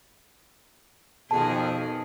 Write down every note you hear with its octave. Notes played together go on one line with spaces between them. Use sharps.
F2 B2 D#3 G#4 A5